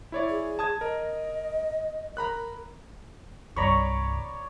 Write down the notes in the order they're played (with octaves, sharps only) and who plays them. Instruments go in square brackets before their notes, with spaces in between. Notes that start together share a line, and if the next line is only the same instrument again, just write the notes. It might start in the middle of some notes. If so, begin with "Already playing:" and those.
[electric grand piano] E4 C#5 D5
[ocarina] G#4
[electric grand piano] A5 D#6 G#6
[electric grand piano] A#4 [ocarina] D#5
[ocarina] A#4 [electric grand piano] A#5 B5 F#6
[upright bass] C2 G2 [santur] C#5 D5 [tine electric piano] A#5 B5 C#6